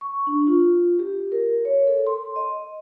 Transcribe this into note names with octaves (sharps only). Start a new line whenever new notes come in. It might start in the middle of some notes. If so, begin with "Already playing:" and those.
C#6
D4
F4
G4
A#4
C#5
A4
C6
D#5